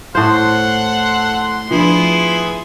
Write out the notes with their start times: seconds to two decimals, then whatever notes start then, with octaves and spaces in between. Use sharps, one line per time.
0.15 A2 A4 C5 F#5 C6
1.71 F3 B3 D4 E4 G#4